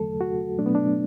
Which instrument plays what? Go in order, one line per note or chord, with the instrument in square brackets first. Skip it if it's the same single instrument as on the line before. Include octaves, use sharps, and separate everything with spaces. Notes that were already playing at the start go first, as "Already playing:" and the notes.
Already playing: [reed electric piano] E2 D3 F#3 A3 A4
F#4
B2 F#3 A3 D4
B3
D4